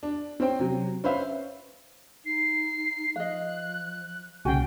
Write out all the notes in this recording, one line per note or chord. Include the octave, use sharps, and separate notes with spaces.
D4
C4 C#4 C5 G5
C3 F#3
C#4 B4 C5 E5 F5
D#4 C7
F3 D#5 F5 F#6
C2 A#2 C#3 C#4 F#4 G5 G#5